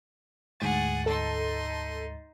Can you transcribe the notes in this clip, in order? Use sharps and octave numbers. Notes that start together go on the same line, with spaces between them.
D2 G#2 G#4 F#5 A6
D#4 A4 C6